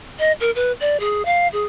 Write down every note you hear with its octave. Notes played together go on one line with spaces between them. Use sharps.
D#5
A#4
B4
D5
G#4
F5
G#4